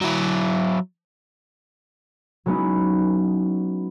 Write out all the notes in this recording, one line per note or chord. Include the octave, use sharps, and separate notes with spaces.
F#3 E4
F#3 G#3 B3 C#4 D#4 E4